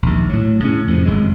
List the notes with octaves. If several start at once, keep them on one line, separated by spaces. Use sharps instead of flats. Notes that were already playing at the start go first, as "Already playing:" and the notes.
A#1 D#2
A2 F#3
A2 C#3 A3 C#4
F2 A2 C3
G#1 F#2 C#3 G#3